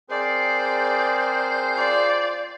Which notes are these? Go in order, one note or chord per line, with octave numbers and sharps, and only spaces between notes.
C4 G#4 A#4 C5 D5
F4 D5